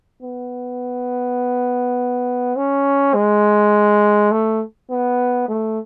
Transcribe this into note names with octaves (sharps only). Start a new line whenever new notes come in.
B3
C#4
G#3
A3
B3
A3